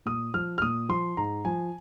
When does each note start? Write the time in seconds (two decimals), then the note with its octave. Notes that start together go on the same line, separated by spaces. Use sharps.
0.06 A#2 D#6
0.34 F3 F6
0.58 F6
0.62 A#2 D#6
0.89 F3 C6
1.17 G#2 A#5
1.45 F3 G#5